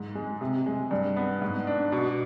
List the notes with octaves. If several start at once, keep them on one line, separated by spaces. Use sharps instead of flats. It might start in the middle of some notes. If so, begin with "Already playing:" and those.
Already playing: G#2
G#3
C3
G#3
G2
B3
G#2
D4
B2